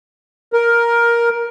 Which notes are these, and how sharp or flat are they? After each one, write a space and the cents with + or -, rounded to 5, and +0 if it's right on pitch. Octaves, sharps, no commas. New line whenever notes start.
A#4 +10